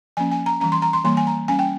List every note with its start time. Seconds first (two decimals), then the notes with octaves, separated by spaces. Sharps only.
0.17 F3 A#3 C#4 G#5
0.31 G#5
0.46 A#5
0.60 E3 G3 C#4 A#5
0.72 C6
0.82 A#5
0.93 C6
1.04 E3 G3 A#3 C6
1.17 G#5
1.27 A#5
1.48 G3 C#4 G#5
1.59 G5